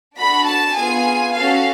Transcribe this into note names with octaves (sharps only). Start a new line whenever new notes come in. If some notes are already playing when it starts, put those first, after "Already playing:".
D4 F#4 A4 B5
A5
B3 F4 G#4 G#5
C#4 F#4 A4 F5